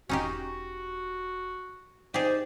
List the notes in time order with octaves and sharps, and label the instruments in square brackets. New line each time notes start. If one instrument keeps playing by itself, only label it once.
[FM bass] E1 [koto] C#4 D#4 G4 [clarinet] F#4
[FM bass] D#4 [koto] G4 G#4 [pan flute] C5 [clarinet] D5